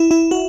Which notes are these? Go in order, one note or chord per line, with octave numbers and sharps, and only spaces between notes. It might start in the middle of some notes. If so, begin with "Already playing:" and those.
Already playing: E4
E4
F#4